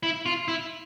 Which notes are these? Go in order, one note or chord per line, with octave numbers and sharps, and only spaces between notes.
E4
F4
E4